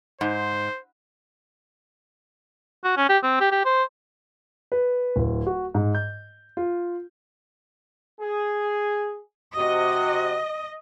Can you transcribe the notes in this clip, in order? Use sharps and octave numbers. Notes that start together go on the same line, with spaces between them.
G#2 C5
F#4
C#4
G4
C4
G4
G4
C5
B4
D1
F#4
G#2
G6
F4
G#4
C3 F#4 D#5